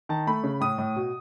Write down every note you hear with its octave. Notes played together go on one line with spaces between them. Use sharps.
D#3 A5
A3 B5
C#3
A2 D#6
A2
B2